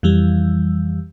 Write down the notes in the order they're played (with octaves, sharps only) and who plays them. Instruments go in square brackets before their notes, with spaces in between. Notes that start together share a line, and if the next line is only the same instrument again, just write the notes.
[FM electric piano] F2 E3 G3